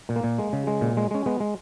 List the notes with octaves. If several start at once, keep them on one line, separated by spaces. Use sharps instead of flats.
A#2
A#3
A#2
G#3
C#3
G#3
A#2
G#3
G#3 C#4
G#3 B3
G#3